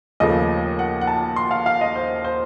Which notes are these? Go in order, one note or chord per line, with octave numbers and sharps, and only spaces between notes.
D#2 C#3 F3 A3 D#5
F#5
F#5
A5
C6
F5
F5
D#5
C5
C5